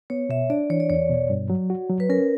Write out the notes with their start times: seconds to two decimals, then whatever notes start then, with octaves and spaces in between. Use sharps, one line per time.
0.10 B3 C#5
0.29 B2 E5
0.50 D4 D5
0.70 E3 C#5
0.80 D5
0.90 E2 C#5
1.10 B2
1.30 G2
1.50 F#3
1.70 F#4
1.90 F#3
2.00 B4
2.09 C#4 A#4